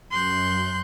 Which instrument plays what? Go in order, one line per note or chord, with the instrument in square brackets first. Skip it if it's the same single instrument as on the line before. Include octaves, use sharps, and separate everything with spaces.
[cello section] F#2 [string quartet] C6 F#6 G6